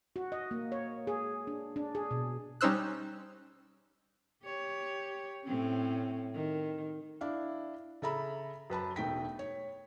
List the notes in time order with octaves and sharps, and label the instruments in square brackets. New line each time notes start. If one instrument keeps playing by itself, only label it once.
[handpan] F#4
D#5
A#3
C#5
G#4
D4
D4
G#4
B2
[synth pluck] G3 C#4 D#4 C5 E6 F#6
[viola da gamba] G4 C#5
A2 C4 C#4
D#3
[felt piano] D4 E4 F5
C#3 A4 E5 A#5 B5
F#2 B4 A5 B5
E1 A3 D#4 G5 B6
C#5